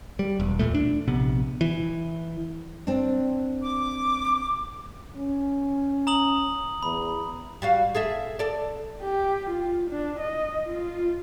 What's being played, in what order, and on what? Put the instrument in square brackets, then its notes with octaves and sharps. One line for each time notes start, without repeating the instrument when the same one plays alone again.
[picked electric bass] G3
E1
E2 G2 A#2 A3
D4
A#1 C3 B3
E3
[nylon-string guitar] C4 D4
[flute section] D6
[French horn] C#4
[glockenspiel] A#5 D#6 F#7
[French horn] E2 [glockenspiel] B5
[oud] G3 F#4 F5
G#4 A4 E5
A4 D5
[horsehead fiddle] G4
F4
D4
D#5
F4